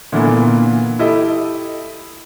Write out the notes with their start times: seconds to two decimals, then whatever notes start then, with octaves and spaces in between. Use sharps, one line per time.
0.12 A#2 D3 E3 A#3 B3
0.99 E4 G4 A4 D#5